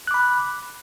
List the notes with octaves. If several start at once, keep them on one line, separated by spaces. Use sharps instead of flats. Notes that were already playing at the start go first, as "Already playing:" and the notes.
B5 D6 F#6